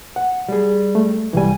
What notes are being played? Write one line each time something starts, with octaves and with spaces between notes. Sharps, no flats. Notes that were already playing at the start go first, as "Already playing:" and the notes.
F#5
G3 G#4
A3
C2 E3 G3 G#5